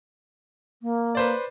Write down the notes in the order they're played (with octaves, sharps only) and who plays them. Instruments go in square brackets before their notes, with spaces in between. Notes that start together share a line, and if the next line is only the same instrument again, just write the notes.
[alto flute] A#3
[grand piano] B4 C5 D5